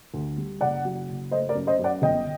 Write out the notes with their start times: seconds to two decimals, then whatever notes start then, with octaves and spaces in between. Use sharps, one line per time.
0.14 D2
0.38 G3
0.61 F#1 D5 F#5
0.85 F#3
1.09 F#1
1.31 A3 C5 D#5
1.49 A#4 D5
1.55 F#2
1.67 C5 D#5
1.79 F#2
1.84 D5 F#5
2.02 G1 D#5 G5